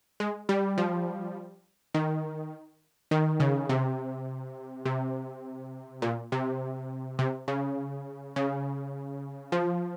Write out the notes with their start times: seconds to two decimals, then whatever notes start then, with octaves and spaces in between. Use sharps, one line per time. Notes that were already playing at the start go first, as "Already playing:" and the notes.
0.20 G#3
0.49 G3
0.78 F3
1.94 D#3
3.11 D#3
3.40 C#3
3.69 C3
4.86 C3
6.02 A#2
6.32 C3
7.19 C3
7.48 C#3
8.36 C#3
9.52 F3